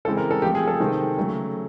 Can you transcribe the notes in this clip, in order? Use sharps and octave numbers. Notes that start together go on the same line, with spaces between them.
C#3 E3 G#3 C4 A4
A#4
A4
F3 A3 C4 G4
G#4
A4
C3 D#3 G#3 C4
C#3 F#3 A3